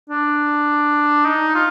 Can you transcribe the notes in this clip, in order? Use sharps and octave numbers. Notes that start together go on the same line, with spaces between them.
D4
D#4
F4